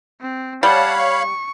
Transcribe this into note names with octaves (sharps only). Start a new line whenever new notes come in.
C4
G3 C#5 F5 F#5 A5 B5
C#6